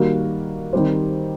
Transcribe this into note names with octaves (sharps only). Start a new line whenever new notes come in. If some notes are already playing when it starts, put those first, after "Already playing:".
Already playing: D#3 G3 A#3 F#4 A#4
D#3 G3 C4 G4 C5